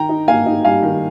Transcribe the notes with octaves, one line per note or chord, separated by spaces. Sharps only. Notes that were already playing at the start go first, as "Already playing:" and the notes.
Already playing: D#3 G5 A#5
D#4
A#3 F5 G#5
D#4
G3 F5 G#5
D#3